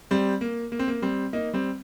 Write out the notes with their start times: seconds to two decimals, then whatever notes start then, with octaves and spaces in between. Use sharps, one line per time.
0.11 G3 C4
0.41 A#3
0.72 A#3
0.79 C4
0.88 A#3
1.02 G3 C4
1.33 A#3 D#4
1.54 G3 C4